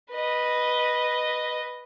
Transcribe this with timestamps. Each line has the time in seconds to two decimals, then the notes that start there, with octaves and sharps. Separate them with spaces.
0.12 B4 D#5